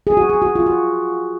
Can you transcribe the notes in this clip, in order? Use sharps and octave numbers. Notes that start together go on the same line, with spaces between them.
G#4
F#4
G#4
F#4
F4
F#4